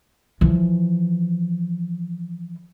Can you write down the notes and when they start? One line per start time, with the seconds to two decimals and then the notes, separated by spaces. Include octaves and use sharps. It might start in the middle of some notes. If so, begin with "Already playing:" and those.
0.41 E3 F3